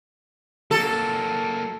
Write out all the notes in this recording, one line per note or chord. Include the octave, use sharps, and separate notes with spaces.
F#3 A#3 A4